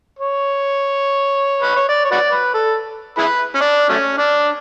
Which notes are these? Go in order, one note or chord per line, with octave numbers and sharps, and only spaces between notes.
C#5
B4
C#5
D5
C#5
F#4 B4 D5
B4
A4
E4 G#4 B4
C#4
D4
F#3 A3 C#4
D4